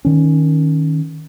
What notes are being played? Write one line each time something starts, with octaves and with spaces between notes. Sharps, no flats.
D#3 C#4